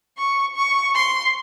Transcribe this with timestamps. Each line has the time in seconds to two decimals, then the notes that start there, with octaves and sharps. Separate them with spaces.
0.18 C#6
0.56 C#6
0.95 C6